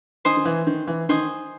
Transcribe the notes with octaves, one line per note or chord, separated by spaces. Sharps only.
D#3 C5 D#5 G#5 D#6
D#3
E3
D#3
E3
D#3 C5 D#5 G#5 D#6